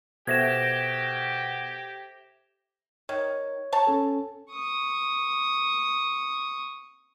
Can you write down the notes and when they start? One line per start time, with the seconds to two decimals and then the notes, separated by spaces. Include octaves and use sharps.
0.27 B2 G4 A4 C5 E5 G#6 A#6 E7
3.09 D#3 C#5
3.72 C#5 A5
3.87 C#4 A4
4.51 C#6 D#6